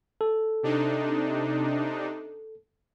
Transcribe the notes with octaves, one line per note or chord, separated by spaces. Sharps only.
A4
C3 D4 D#4